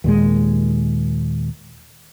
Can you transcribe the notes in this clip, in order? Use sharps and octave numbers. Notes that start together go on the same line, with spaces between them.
D#2 A#2 G#3